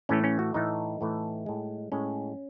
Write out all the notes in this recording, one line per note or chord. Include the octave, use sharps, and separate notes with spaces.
A2 E3 A3 C#4
C#4
F#4
A2 E3 A3 D#4
A2 E3 A3
A2 G#3
A2 G#3 C#4